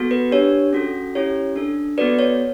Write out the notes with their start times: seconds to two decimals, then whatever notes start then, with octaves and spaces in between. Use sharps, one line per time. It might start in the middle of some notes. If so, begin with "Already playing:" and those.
Already playing: B3 F#4 A4
0.11 B4
0.31 D4 G4 C#5
0.73 C#4 F#4 A4
1.15 C#4 E4 G4 C#5
1.56 D4 A4
1.98 B3 F#4 A4 B4 D5
2.19 C#5